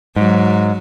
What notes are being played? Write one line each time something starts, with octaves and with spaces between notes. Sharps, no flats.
G#2 F#3